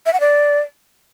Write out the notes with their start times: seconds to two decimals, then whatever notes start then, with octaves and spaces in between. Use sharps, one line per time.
0.06 E5
0.13 F#5
0.20 D5